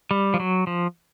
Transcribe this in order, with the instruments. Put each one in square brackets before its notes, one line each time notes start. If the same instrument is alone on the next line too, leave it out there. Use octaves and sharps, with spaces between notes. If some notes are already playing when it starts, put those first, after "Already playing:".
[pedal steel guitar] G3
F3
F#3
F3